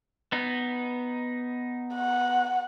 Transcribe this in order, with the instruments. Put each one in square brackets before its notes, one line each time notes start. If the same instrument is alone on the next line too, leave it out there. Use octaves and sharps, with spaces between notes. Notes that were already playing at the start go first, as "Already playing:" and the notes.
[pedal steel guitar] B3 D#4
[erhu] F#5